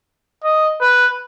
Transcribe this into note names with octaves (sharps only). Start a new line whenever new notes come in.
D#5
B4